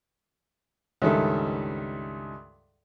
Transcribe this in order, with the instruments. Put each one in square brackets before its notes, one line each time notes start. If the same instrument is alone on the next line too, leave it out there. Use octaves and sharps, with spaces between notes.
[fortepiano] C#2 G2 D#3 A4 E5